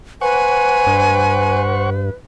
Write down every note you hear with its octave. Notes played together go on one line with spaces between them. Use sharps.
B4 C5 F#5 G#5 C#6
G2